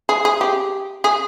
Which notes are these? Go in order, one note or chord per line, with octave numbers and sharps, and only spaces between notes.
G#4
G#4
G4
G#4